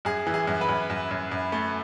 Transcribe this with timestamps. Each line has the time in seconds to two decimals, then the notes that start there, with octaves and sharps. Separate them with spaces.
0.05 F#2 G#4
0.27 E3
0.34 G#4
0.47 F#2
0.61 B4
0.69 F#2
0.90 F#2
1.11 F#2
1.32 F#2
1.52 A3